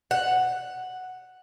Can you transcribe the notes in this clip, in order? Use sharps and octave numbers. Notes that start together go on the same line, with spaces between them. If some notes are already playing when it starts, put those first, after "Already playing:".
F#5